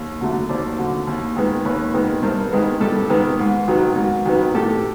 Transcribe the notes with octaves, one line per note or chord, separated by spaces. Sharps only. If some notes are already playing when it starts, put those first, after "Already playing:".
Already playing: D#2
D3 F#3 A3
D#2 C5 D5
D3 F#3 A3
D#2
D#3 G#3 B3
D#2 B4 C#5
D#3 G#3 B3
G2 A#4 C5
D#3 G#3 B3
G2 G4 A4
D#3 G#3 B3
G#2
D#3 F#3 B3
G#2
D#3 F#3 B3
A2 G4 A4